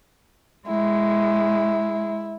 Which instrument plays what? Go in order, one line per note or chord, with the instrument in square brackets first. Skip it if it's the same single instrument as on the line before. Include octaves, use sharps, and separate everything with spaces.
[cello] G#3 [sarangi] E4